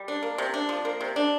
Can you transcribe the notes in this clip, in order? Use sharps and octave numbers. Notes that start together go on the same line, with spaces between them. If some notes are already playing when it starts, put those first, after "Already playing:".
Already playing: G3
D4
A#3
C3
D4
F3
A#3
C3
D4